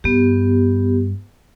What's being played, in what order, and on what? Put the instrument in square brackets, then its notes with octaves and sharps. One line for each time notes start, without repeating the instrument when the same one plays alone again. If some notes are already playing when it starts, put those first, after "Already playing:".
[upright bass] G2 [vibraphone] B3 G4